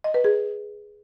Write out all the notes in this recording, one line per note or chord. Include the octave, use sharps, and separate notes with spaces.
D#5
B4
G#4